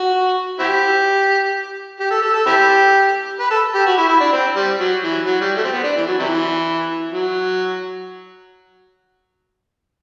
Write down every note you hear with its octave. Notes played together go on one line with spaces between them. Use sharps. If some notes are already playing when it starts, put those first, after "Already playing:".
Already playing: F#4
C4 E4 G4
G4
A4
A4
A4
C4 E4 G4
B4
A4
G4
F#4
E4
E4
D4
C4
G3
F#3
E3
F#3
G3
A3
C4
B3
D4
E3
F#3
C3 E3
F#3